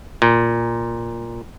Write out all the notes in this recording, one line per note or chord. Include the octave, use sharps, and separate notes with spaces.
A#2